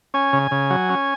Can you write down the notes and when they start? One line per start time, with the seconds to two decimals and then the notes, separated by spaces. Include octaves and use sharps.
0.14 C#4 G#5
0.33 C#3
0.51 C#3
0.70 F#3
0.89 C#4